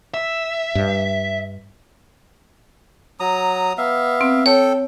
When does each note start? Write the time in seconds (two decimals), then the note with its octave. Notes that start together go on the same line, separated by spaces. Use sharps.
0.14 E5
0.75 G2
3.20 F#3 A#5 D#6
3.78 B3 E5 F5
4.21 C4
4.46 A4 C#5 G5